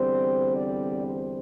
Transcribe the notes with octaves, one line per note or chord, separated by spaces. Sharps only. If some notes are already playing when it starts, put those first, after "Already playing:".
Already playing: E2 D3 G3 C4 C5
D5
C5